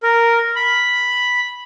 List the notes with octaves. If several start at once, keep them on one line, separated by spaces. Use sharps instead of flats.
A#4
B5